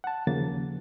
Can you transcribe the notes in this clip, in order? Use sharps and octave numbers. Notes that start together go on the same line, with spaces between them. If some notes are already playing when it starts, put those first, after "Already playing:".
F#5 A5
D#2 C#3 F3 A#3 A6